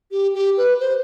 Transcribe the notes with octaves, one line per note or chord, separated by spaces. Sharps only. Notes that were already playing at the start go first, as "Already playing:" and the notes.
G4
G4
B4
C5